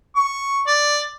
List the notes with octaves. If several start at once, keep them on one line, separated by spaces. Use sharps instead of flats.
C#6
D5